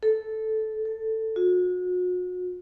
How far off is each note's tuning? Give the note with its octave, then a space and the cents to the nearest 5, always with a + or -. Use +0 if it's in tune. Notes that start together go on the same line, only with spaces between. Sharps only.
A4 -10
A4 +10
F#4 -35